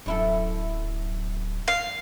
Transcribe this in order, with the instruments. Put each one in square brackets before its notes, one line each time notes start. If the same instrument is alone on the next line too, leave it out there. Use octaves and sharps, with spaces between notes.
[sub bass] D1 [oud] F#2 E4 A4
[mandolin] F5